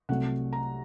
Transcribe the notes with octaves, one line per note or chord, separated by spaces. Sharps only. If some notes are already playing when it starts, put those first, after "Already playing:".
C2 C3 F#3 A3 F#5
A#5